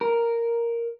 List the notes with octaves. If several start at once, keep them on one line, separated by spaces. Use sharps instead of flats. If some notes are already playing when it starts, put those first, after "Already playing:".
A#4